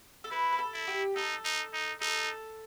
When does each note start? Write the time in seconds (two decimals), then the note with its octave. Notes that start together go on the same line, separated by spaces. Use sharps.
0.24 A4
0.31 E4 B4
0.53 B4
0.59 A4
0.73 E4
0.88 G4
1.16 D#4 A4
1.44 D#4
1.73 D#4
2.01 D#4 A4